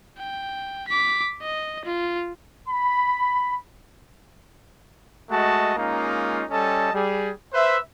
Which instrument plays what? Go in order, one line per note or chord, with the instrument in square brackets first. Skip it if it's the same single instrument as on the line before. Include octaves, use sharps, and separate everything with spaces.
[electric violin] G5
D6 B6
D#5
F4
[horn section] B5
[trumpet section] G#3 A3 F#4 D#5 A5
G#3 A#3 C#4 D#4 F4
G3 C#4 A4 D#5 A5
G3 G#4
B4 C5 E5